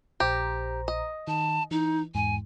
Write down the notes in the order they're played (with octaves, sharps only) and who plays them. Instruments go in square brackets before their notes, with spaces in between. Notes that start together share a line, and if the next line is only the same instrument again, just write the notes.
[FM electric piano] A#1 C5 A#5 [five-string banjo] G4
[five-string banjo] D#5
[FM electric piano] D#3 [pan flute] A5
[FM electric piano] E3 [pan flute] D#4
[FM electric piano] E2 G#2 [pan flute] G#5